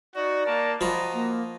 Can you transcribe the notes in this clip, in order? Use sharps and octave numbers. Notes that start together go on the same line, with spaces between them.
D#4 F#4 D5
A#3 A#4 A5
F3 F#4 D#5 A#5 B5
A#3